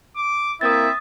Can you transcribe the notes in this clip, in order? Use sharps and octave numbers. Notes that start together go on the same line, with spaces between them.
D6
A#3 C4 E4 E5 D#6 A6